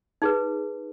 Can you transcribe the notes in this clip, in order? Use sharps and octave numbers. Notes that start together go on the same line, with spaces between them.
D#4 G#4 B4